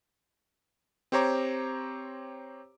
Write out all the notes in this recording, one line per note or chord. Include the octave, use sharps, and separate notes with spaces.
C4 G4 C5 C#5 A#5 D6